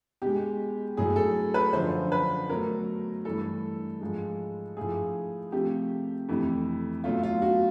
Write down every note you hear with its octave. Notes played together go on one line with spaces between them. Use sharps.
B2 G#3 G4
A2 F#3 A3 G#4
A4
B4
F#2 D3 F3 C5
B4
B2 F#3 A3 A#4
G2 E3 A3 A4
G#2 F3 G#3
A2 F3 A3 G#4
C3 F3 A3 G4
F2 C3 E3 A3
B2 F#3 A3 F4
F4
F#4